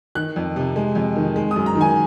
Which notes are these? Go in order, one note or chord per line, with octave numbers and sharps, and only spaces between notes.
D#3 F#6
F2
C3
G#3
F2
D#3
G#3
D#6
F#2
A#5
D#3
G#5